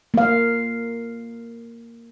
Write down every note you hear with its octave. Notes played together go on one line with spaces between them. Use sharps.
A#3 F5